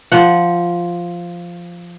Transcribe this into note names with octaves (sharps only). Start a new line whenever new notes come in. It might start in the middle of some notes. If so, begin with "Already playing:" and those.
F3 F#5